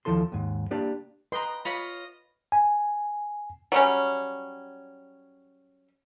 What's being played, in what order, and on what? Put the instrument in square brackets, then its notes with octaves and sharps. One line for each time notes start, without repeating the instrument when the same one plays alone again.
[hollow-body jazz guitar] D#2 F3 E4 A4 C6
D#2 G#2
A#3 D4 G4 D5
[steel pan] B4 D#5 C6 [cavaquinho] G5 A#5
[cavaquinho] F4 C#5 [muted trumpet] D#5 [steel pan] B5
[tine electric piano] G#5
[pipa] F#3 G3 C#4